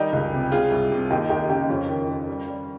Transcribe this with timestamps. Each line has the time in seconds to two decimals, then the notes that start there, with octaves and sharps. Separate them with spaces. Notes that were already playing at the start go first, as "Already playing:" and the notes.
Already playing: D#3 G3 D#4 G4
0.12 C#2
0.33 C3
0.52 C3 F4 G#4
0.72 C2
0.91 C3
1.10 D#2 D#4 G4
1.29 D#2 D#4 G4
1.49 C#3 D#4 G4
1.69 F2 C#4 F4
1.88 D#3
2.08 D#3
2.28 G3
2.47 G3